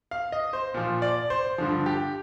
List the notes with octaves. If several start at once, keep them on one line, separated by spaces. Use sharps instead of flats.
F5
D#5
C5
A#2 F3
D5
C5
G2 D3 F3
G4